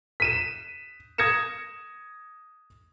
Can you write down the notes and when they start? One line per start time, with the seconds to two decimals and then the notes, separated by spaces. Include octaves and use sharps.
0.20 B6 D#7 E7
1.18 D#6 G#6 A#6 C#7 E7